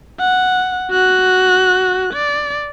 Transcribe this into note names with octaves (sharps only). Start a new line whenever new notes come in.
F#5
F#4 F#6
D5